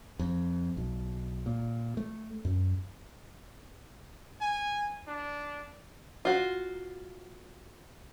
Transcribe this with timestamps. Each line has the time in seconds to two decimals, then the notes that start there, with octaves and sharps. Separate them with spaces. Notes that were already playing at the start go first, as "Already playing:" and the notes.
0.19 F2
0.77 B1
1.46 A#2
1.97 A3
2.45 F#2
4.41 G#5
5.08 D4
6.25 F4 F#4